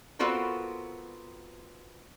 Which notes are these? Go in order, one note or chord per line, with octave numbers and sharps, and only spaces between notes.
B3 C4 F4 F#4 A4 A#4